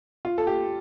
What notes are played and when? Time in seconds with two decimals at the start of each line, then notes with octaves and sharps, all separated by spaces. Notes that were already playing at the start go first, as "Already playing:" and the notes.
0.25 F4
0.38 A4
0.47 G4